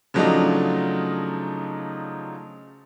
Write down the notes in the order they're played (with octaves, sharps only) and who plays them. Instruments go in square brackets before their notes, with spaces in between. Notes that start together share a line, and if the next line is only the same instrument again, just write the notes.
[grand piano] C#3 F3 F#3 A3 D4 D#4